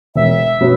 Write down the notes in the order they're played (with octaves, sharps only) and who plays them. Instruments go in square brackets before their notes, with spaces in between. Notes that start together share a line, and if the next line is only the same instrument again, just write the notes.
[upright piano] E1 [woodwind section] E5
[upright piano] B2 F#3 B3